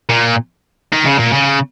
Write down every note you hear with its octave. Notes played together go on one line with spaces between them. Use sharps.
A#2
D#3
C#3
A#2
C#3